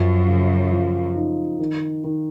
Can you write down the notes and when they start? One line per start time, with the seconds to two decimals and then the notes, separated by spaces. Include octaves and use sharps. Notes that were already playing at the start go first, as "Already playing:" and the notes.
Already playing: F#2 F3
0.27 C#3
0.72 F3
1.16 D#4
1.59 D#3
2.04 D#3